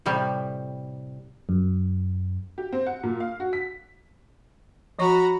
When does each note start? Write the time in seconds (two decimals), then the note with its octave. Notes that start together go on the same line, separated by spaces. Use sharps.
0.06 A2 C3 G3
1.49 F#2
2.58 G4
2.73 C4
2.87 F#5
3.03 A#2
3.20 F5
3.40 F#4
3.53 B6
4.99 F3 F#4 C#5 A#5 B5 C#6